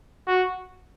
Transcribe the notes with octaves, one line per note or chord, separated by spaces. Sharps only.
F#4